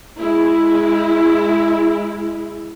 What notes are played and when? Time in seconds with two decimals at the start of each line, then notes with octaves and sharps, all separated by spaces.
0.17 G#3 E4